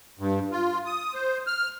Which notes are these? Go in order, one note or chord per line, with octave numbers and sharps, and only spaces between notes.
G2
F4
D#6
C5
F6